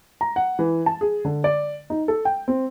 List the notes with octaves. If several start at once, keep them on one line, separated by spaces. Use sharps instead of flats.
A#5
F#5
E3
A5
G#4
D3
D5
D#4
A4
G5
C4